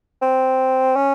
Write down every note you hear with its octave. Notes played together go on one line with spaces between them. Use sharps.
C4
C#4